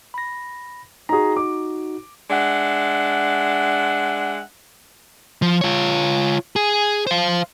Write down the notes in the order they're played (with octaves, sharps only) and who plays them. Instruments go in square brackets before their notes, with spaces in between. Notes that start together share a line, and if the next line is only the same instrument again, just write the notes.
[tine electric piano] B5 A#6
[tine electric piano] D#4 F#4 [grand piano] G#4 A#5
[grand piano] D6
[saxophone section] G#3 D4 E5 F#5
[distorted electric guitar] F3
F4 C#5
G#4
C5 F5